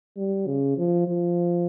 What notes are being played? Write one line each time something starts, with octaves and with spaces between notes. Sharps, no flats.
G3
C#3
F3
F3